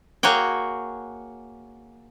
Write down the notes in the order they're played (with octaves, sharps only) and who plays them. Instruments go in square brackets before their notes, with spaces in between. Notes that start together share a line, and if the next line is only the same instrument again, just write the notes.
[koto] A#3 F#4 G#4 C#5 G5